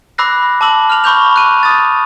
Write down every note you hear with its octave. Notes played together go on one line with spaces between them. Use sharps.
B5 D6 E6 F#6 A#6 C7
A5 B5 D6 E6 F#7
F6 F7
B5 C#6 D6 G6 F7
F#6 D#7
D#6 A6